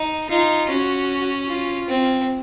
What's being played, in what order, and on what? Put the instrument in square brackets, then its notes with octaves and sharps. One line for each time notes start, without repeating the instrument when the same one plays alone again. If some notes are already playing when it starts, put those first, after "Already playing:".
Already playing: [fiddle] D#4
[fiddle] D#4 [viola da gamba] F4
[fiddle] C#4 [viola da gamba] F#4
[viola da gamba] F4
[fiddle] C4